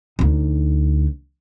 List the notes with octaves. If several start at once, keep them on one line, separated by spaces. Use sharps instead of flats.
D2 D#4